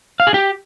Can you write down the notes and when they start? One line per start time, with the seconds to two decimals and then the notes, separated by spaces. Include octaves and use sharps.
0.20 F5
0.27 G#4
0.34 G4